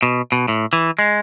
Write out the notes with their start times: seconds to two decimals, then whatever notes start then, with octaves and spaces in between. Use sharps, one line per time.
0.03 B2
0.32 B2
0.48 A2
0.73 E3
0.99 G#3